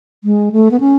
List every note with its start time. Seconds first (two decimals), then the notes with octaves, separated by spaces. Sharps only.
0.24 G#3
0.52 A3
0.71 B3
0.80 C#4